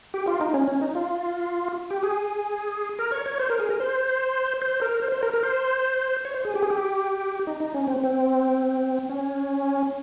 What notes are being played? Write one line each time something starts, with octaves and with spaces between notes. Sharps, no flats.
G4
F4
D#4
C#4
C#4
D#4
F4
G4
G#4
A#4
C#5
C#5
C5
A#4
G#4
A#4
C5
C5
A#4
C5
C5
A#4
A#4
C5
C#5
C5
G#4
G4
G#4
G4
D#4
D#4
C#4
C4
C4
C#4